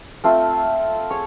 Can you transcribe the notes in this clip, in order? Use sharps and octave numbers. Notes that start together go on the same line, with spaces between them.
A3 C4 F4
G#4 C#5